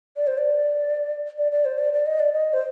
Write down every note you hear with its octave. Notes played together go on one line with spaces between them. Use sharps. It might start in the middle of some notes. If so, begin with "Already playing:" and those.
D5
C5
D5
D5
D5
C5
D5
D5
D#5
D5
D#5
C5